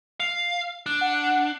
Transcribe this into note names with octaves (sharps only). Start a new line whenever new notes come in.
F5
D4
F#5